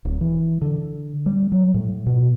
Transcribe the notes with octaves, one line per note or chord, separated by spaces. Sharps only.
D1
E3
D3
G3
F#3
A2
B2